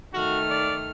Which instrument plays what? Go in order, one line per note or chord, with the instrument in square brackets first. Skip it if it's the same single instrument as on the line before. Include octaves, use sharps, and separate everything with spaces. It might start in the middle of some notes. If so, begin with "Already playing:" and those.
[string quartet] D#3 A3 F6 [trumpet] F#4
[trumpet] D5